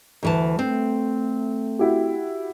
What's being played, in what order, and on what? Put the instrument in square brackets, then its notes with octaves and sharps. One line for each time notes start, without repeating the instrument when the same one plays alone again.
[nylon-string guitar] D2 E3 A5
[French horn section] A3 [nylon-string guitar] C4
[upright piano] E4 F#4 G4